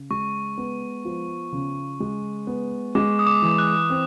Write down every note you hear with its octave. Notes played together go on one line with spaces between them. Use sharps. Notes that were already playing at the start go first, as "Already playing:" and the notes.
Already playing: C#3
G#3 C#6
B3
F3
C#3
G#3
B3
G#3 D6
D#6
D6
E3
F#6
C4